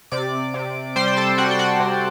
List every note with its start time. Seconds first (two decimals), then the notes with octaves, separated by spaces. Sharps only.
0.12 C3 D5 D6
0.54 C3
0.96 G3 C5 C6
1.08 G5
1.17 A4 A5
1.38 G3 F#4 F#5
1.51 G5
1.59 F#4 F#5
1.80 C3